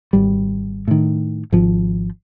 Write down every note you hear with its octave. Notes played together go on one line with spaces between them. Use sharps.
G#1 G3
A2 D#3
G#1 F3